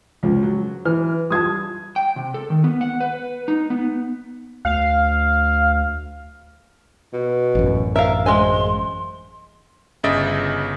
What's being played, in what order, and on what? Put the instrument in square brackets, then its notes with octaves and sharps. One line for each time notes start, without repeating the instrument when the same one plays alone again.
[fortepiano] C#2 F3
F#3
[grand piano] E3 [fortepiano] F6
[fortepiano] G3 F4 A5 [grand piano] D#6 G#6
[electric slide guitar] G5
C3
A4
D#3
B3
F#5
B4
D#4
B3
[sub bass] D2 [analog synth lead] F5
[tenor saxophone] B2
[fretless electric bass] A1 F#2
[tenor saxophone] A#4 [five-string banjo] E5 F5
[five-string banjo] G#3 D#5 G#5 [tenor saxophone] C5 [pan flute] C6
[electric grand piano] G1 C#3 D#5 E5 A6 D7